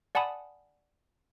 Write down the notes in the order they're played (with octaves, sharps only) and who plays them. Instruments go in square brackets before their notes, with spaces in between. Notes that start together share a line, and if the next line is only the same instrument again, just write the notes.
[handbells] D5 F#5 G#5 A5 B5 D#6